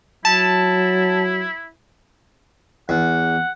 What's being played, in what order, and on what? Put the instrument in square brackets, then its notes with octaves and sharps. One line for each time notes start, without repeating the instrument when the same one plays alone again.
[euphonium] F#3 [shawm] E4 [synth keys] A5
[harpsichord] E2 [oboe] F#5